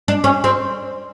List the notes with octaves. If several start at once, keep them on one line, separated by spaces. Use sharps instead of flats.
D4
C#4
C4